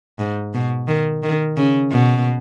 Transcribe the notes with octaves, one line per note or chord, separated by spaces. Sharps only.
G#2
B2
D#3
D#3
C#3
B2